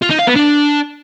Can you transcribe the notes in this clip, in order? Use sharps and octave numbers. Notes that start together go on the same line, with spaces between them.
F4
D#4
F5
B3
D4